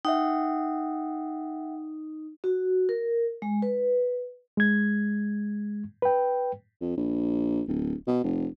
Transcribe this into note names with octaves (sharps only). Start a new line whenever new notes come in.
D#4 E5 F#5 G5
F#4
A#4
G#3
B4
G#3 G#6
B4 G5
F2
A#1
D1
B2
F1